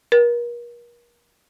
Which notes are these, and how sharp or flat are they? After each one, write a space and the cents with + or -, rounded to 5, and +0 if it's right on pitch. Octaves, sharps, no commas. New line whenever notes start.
A#4 +40